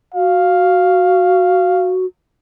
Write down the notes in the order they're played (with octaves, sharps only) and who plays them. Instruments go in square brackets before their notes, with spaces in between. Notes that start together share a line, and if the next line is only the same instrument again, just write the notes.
[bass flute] F#4 [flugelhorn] F5